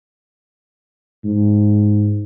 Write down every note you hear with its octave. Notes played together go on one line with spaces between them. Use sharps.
G#2